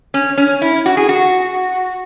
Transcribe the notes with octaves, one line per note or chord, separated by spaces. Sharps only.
C#4
C#4
E4
F#4
G#4
F#4